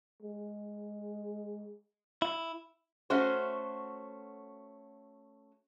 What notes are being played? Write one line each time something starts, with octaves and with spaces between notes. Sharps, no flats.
G#3
E4
A3 C#4 F#4 C5